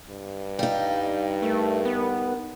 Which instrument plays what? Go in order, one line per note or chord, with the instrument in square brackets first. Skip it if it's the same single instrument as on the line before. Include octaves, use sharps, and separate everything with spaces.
[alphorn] G2
[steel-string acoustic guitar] G3 D#4 [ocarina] F5
[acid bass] A3 [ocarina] A#4
[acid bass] B3